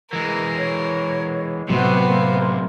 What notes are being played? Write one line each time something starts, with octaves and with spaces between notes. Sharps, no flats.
E3 G#3 A#4
C#5
A2 C3 F#3 B3 F#4 C5
A#3